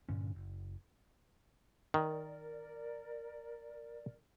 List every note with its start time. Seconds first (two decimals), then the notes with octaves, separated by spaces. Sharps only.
0.09 G2 A#2 D3 C#4
0.35 F#1
1.94 D#3 A#4 D5